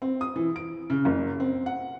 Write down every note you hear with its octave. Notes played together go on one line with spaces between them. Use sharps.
C4
D#6
E3
D7
C#3
F#1
C4
F#5